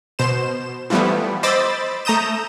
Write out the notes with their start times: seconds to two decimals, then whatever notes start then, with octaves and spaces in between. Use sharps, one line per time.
0.19 B2 C5 E7
0.90 E3 F3 G3 A3 B3
1.43 C5 D#5 B5 D6 E6 A6
2.05 A3 A#5 D#6 G6 E7